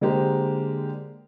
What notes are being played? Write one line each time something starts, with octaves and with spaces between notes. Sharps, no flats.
D3 G#3 A#3 G4 C5